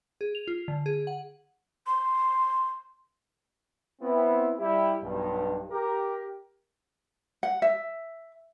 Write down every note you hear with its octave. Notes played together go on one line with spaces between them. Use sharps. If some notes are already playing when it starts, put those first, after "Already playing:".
G#4
F7
F4
D3
G#4
F#5
C6
B3 C4 E4
G3 E4 G4
B1 G2
G4 A#4
F#5
E5